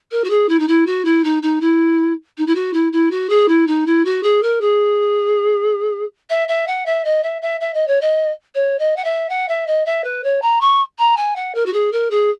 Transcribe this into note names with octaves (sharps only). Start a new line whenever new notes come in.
A#4
F#4
G#4
E4
D#4
E4
F#4
E4
D#4
D#4
E4
D#4
E4
F#4
E4
E4
F#4
G#4
E4
D#4
E4
F#4
G#4
A#4
G#4
E5
E5
F#5
E5
D#5
E5
E5
E5
D#5
C#5
D#5
C#5
D#5
F#5
E5
F#5
E5
D#5
E5
B4
C#5
A#5
C#6
A#5
G#5
F#5
A#4
F#4
G#4
A#4
G#4